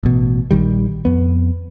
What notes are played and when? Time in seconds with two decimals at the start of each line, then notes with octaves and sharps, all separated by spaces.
0.03 A1 B2
0.51 A#1 D#3 G3
1.05 F2 B3